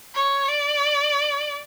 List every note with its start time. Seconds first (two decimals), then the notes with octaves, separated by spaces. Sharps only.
0.15 C#5
0.48 D5